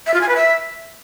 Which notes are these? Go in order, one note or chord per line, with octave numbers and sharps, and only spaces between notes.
E5
F4
G#5
B4
E5